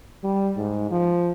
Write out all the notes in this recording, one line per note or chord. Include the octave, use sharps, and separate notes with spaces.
G3
G#2
F3